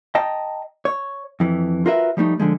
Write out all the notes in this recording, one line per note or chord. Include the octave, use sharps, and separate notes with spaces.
D#5 G5 A5 A#5
C#5
F2 E3
F4 F#4 A#4 B4 E5
F3 G3 A3 D#4
D3 F3 G#3